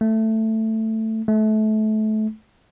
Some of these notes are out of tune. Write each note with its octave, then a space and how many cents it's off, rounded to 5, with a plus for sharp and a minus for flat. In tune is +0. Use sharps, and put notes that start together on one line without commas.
A3 +10
A3 -25